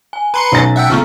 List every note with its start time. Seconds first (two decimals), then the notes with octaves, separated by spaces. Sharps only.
0.13 G#5
0.34 B4 A#5 C6 C#7
0.52 B1 C#4 A6
0.76 E5 F#5 G5
0.90 C#3 F3 B3 C#6 F6